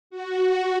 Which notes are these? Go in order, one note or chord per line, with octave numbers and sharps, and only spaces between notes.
F#4